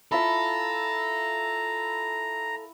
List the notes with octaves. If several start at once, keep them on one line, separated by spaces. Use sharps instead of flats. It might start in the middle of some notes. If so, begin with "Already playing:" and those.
E4 F4 A4 E5 A#5